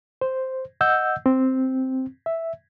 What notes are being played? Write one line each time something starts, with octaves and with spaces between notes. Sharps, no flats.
C5
D#5 F#5 E6 G6
C4
E5